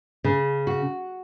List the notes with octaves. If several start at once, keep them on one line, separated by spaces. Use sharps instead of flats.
C#3
F#4